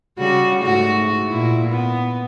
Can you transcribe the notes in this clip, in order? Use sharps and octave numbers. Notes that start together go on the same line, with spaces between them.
C#3 G3 F#4
G#2 A3 F#4
A#2 E4
B3